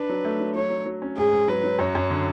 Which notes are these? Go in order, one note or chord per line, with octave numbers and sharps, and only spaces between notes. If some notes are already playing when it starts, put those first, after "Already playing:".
Already playing: D4 B4
F#3
A3
F#3
F#3 C#5
F#3
F#3
C#4
G#2 G#4
G#2
F#3 B4
F#3
F#2 C#5
F#2
D3